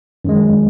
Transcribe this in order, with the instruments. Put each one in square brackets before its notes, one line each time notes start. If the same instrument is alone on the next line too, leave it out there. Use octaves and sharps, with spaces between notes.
[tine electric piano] F#2 D#3 G#3